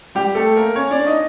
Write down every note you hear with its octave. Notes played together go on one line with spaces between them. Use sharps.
G3 G4
A3 A4
A#3 A#4
C#4 C#5
D4 D5
D#4 D#5